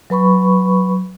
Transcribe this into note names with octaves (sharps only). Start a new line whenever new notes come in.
F#3 B4 B5 C#6